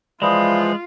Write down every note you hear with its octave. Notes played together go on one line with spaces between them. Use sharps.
E3 F3 G#3 F4 D5 B5 D#6